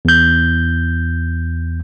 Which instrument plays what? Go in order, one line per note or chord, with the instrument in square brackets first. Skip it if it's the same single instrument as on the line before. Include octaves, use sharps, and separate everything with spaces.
[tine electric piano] E2 G6